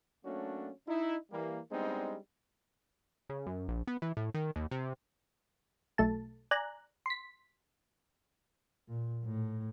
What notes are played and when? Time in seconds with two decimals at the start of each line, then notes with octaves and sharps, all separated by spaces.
0.25 F#3 A3 A#3 C#4 D4 F#4
0.87 D#4 E4
1.31 E3 G3 A#3
1.71 G3 G#3 B3 C4 D4 D#4
3.29 C#3
3.47 F#2
3.68 A#1
3.87 B3
4.02 E3
4.17 A2
4.34 D#3
4.56 D#2
4.71 C3
5.98 B1 A3 A5
6.51 D5 G#5 A#5 F#6
7.06 C6 B6
8.88 A#2
9.24 A2